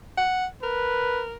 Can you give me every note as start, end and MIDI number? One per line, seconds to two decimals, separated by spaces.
0.17 0.46 78
0.63 1.35 70
0.63 1.24 71